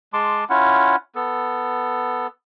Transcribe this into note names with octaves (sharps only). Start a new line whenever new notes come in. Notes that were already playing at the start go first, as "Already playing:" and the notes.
G#3 A5 C6 D6
C#4 E4 F4 F#5
B3 A4